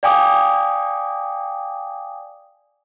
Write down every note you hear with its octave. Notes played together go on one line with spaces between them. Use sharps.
D5 F5 G5 G#5 D6 D#6